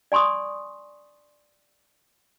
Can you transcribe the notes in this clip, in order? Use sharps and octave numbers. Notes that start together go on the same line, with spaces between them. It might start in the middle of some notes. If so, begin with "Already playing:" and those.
D5 G#5 C6 C#6 D#6